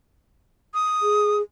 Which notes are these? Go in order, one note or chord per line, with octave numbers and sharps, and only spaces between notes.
D#6
G#4